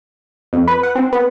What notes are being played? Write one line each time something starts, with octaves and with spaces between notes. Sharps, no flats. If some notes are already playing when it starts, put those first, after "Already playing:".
F2
B4
F#5
C4
B3